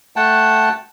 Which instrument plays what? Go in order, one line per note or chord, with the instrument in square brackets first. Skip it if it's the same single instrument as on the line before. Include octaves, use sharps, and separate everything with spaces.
[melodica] A3 F#5 G5 A5